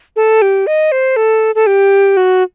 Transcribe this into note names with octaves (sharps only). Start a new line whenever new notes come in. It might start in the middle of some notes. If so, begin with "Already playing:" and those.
A4
G4
D#5
C5
A4
A4
G4
F#4